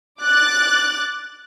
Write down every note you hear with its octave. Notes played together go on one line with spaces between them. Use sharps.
D6 F#6 A6